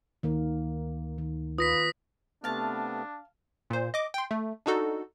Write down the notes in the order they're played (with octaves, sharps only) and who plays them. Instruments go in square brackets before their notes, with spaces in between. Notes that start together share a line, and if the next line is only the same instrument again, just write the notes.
[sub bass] D2 [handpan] D#3 A#3 A#4
[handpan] D#3
[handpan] F4 B4 [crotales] D#6 A#6 B6
[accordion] C3 A3 B3 [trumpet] D4 [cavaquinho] F5 A5
[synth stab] A#2 C5
D#5 D6
G5 C6
A3
D4 D#4 F#4 A4